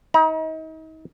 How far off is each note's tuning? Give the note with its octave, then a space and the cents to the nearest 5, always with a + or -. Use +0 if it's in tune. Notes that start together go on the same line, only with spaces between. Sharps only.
D#4 +35 A#5 +45